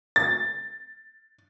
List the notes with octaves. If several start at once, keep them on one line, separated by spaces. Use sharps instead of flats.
A6